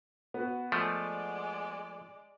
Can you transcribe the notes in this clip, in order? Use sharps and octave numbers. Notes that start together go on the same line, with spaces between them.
B3 F#4
F3 G#3 A3 D5